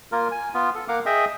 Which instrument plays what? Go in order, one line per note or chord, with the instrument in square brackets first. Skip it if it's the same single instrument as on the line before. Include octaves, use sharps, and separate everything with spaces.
[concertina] A#3 F4 A#4
G#5
B3 F4
A4
A#3 A#4 F5 F#5 D6
G#4 D#5 E5 G5 D#6